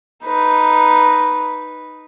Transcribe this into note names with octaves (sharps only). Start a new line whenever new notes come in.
D#4 B4